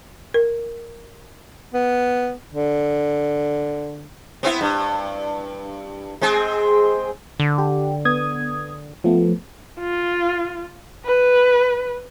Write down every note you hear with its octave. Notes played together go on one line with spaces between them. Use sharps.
A#4
B3
D3
B3 C4 E4
G2
G#3 C4 G#4
D3
G4
B3 D#6 G#6
F3 A3 B3
F4
B4